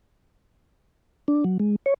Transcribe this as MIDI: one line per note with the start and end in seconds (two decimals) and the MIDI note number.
1.28 1.44 62
1.44 1.58 54
1.59 1.76 56
1.86 1.94 73